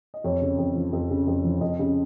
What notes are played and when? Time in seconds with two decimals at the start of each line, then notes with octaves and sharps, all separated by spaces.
0.14 D#5
0.24 F2 C#5
0.42 C#3
0.58 F2
0.75 F3
0.93 F2
1.10 C#3
1.27 F2
1.44 F3
1.61 F2 D#5
1.79 C#3